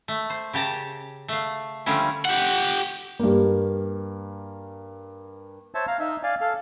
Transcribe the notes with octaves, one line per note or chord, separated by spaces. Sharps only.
A3
C5
C#3 G4 A5 A#5
A3 F5
D3 F3 G3 A3 C#4
G4 F#5
G2 A#3
C5 C#5 E5 A5
F5 A#5
D#4 E5
D5 F5 G#5
A4 F5